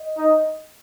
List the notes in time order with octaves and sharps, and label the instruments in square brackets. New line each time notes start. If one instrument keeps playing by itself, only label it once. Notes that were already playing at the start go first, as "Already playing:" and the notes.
Already playing: [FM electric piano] D#5
[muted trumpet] D#4